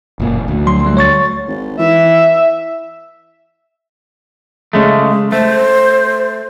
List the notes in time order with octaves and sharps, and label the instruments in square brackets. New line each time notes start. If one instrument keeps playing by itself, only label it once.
[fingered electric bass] F#1 A#2
D2
[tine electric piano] F#3 C6
G3 A3
C#5 C#6 A6
[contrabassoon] G#1
[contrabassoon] E3 [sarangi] E5
[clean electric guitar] C#3 G#3 A3
[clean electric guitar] A3 [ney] C5